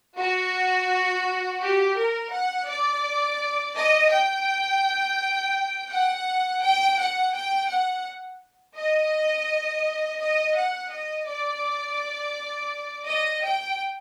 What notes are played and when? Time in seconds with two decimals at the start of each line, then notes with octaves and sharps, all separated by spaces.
0.18 F#4
1.61 G4
1.97 A#4
2.33 F#5
2.68 D5
3.76 D#5
4.12 G5
5.91 F#5
6.62 G5
6.99 F#5
7.34 G5
7.70 F#5
8.77 D#5
10.21 D#5
10.57 F#5
10.92 D#5
11.27 D5
13.07 D#5
13.44 G5